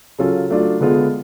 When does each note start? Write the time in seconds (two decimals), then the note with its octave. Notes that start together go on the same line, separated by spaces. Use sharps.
0.18 C#3 F#3 C#4 F4 A4
0.50 F#3 A3 D4 F4
0.81 D3 G#3 B3 F4 G#4